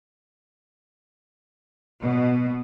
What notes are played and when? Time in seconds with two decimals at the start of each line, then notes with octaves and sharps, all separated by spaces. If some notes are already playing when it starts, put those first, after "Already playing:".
2.01 D1 B2